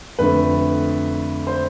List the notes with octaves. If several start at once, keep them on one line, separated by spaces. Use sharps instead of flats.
F2 D3 A3 B4
C5